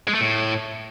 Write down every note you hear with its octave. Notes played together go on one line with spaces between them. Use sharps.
G#3
A3
A2